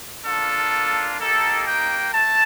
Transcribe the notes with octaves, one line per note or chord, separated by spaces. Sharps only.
A#3 D4 F4 A4
A#3 D#4 G4 A4
G5
A3 A5